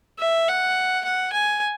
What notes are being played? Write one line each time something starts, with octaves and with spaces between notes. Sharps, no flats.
E5
F#5
F#5
G#5